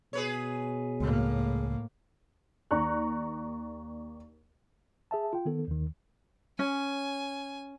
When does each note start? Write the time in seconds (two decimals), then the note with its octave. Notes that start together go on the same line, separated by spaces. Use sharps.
0.13 B2 G#4 B4 C#5
1.00 C#2 A2 A#3
2.71 D#2 D5 A#5 C#6 F#6
5.11 G#4 E5 A5
5.33 F4 G5
5.45 D#3 B3 A4
5.68 D#2 D#3
6.59 C#4 G#5